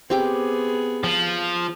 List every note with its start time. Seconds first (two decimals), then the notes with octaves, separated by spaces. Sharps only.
0.10 B3 C4 G4 G#4 D6
1.04 F3